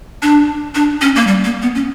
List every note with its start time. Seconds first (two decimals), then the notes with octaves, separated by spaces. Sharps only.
0.23 D4
0.75 D4
1.01 C#4
1.16 A#3
1.27 G3
1.44 A#3
1.62 B3
1.75 C#4